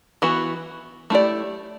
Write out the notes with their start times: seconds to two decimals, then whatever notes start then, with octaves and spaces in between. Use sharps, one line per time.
0.22 E3 B3 F#4 B4
1.10 A3 E4 G4 D5